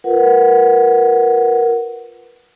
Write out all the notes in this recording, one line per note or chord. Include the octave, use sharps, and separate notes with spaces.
F4 A#4 B4 F#5